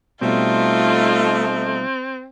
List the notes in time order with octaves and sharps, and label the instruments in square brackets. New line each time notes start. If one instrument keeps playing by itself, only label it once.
[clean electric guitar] B2 G3 [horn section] A3 D#4 [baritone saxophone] C4 [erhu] F4